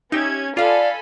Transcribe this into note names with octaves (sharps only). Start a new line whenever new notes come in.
C#4 D#4 G4 E5 G#6
D4 F4 A4 D5 F5 G#5 B5